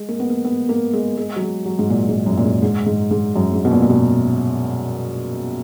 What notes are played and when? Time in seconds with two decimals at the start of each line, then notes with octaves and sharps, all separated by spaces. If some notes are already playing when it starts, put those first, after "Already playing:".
Already playing: G#3
0.09 A#3
0.20 B3
0.30 A#3
0.45 B3
0.69 A#3
0.93 G#3
1.17 G#3
1.36 F#3
1.42 G#3
1.66 F#3
1.79 G#2
1.90 A#2
2.09 G#2
2.26 F#2
2.38 A#2
2.45 G#2
2.62 G#2
2.86 G#2
3.11 G#2
3.36 F#2
3.53 G#2
3.65 B2
3.71 A#2
3.82 A#2
3.90 B2